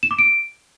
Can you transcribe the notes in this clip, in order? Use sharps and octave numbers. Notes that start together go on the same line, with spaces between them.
E7
D6
D7